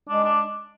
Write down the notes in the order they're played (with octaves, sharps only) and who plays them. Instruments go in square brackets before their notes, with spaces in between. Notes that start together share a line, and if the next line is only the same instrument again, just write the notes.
[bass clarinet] G#3 [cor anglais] D4
[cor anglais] D4